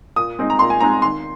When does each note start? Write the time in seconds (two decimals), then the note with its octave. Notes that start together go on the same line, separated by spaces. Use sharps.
0.16 A#2 D#6
0.39 G#3 C4 D#4
0.50 A#5
0.59 A#2 C6
0.70 G#5
0.81 G#3 C4 D#4 A#5
1.02 D#3 C6